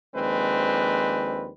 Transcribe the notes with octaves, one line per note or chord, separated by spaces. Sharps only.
D#2 F3 G#3 C4 D4 B4